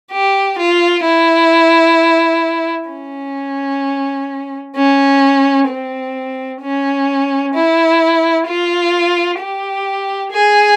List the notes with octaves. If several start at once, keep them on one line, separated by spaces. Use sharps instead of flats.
G4
F4
E4
C#4
C#4
C4
C#4
E4
F4
G4
G#4